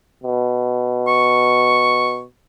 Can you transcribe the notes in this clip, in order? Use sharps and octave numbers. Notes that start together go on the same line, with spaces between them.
B2
C#6